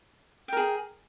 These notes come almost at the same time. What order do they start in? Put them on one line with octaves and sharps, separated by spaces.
G5 A#4 G#4